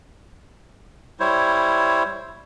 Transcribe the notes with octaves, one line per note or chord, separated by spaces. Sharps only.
G3 E4 C5 C#5